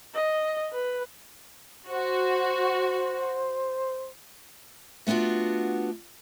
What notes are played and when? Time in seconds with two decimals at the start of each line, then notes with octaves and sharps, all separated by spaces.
0.14 D#5
0.73 B4
1.89 F#4 C5
5.07 A3 B3 D4 F4 F#4